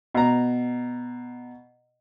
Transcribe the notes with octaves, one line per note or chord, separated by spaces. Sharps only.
B2 A#5